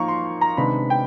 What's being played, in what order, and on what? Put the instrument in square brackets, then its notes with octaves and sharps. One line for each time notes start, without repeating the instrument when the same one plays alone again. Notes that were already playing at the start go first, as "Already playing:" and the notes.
Already playing: [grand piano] F3 A#3 D#4 A#5 C#6
C6
A#5
C3 D#3 G#3 B3 D4 B5
G5